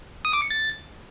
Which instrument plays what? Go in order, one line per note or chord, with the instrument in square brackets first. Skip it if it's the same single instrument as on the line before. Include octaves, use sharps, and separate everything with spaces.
[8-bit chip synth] D#6
D6
C#7
A6